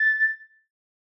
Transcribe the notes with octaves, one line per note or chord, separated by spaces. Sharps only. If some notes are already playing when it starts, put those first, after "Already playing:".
Already playing: A6